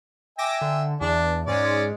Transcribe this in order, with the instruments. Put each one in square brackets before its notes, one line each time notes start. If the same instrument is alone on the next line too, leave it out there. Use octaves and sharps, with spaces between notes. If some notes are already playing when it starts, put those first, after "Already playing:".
[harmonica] E5 G5 G#5 [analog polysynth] D6 A#6
[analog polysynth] D3
[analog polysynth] E2 [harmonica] D4
[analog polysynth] G#2 G#3 [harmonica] C#4 D5